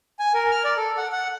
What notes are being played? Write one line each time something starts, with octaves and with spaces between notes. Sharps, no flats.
G#5
A#4
F6
D5
A4
F#5
F#5